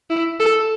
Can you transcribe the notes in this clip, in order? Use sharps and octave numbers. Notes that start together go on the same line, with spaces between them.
E4
A4